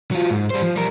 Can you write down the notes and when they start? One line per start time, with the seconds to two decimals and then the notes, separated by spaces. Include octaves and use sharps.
0.11 F#3 F4
0.31 G#2
0.50 G3 C5
0.62 F3
0.75 G3 A#4